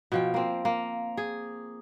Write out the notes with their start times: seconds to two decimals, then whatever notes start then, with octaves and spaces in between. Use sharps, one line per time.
0.12 B2 F3 G5
0.34 A#3 C4
0.65 A#3
1.17 G#4